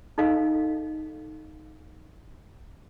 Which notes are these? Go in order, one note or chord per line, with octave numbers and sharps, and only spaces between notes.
D#4 A4 D#5 F5